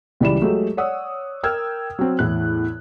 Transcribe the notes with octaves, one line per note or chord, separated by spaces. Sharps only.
C#2 E3 G3 D5 B5 E7
F#3 G#3 A3 G4
C#5 D5 F#5 D#6 E6
A#4 G5 E6 F6 G#6
F#3 C4
E2 A2 F#6